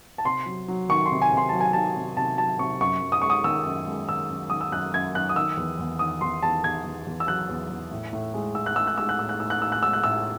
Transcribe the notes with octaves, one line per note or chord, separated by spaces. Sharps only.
A5
C3 C6
F#3
F#3
D#3 C#6
C6
C3
G#5
C3 C6
F#3 A5
G#5
D#3 A5
C3
C3 A5
F#3 A5
C3 C#6
F#2 C#6
F#2
D#6
G#3 C#6
D#6
D#3 E6
F#2
G#3
D#3 E6
F#2
D#3 D#6
E6
F#2 F#6
F#2 G#6
F#2 F#6
D#6
D#3 E6
E2
E2
D#3 D#6
E2 C6
E2 A5
E2 G#6
E2
E2
E6
F#3 F#6
E2
E2
A2
A2
G#3
A2 E6
F#6
G#3 E6
F#6
G#3 E6
F#6
A2 E6
F#6
A2 E6
F#6
A2 E6
F#6
G#3 E6
F#6
A2 E6